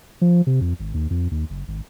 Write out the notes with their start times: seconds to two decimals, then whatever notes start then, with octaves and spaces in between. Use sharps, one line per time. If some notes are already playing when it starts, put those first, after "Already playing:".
0.21 F3
0.47 C3
0.61 F2
0.80 G#1
0.94 D#2
1.10 F2
1.31 D#2
1.50 F#1
1.68 G#1